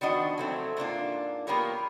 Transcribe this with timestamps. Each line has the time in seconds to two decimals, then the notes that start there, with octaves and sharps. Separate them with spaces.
0.01 D#3 F3 B3 D4 F#4 D#5
0.38 F#3 A3 C4
0.77 G#2 A#3 D4 F4
1.47 A#3 B3 F4 G4 A#4 C#5